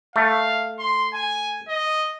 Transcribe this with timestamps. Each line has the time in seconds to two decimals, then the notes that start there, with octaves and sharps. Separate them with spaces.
0.16 A3 F5
0.79 C6
1.14 G#5
1.69 D#5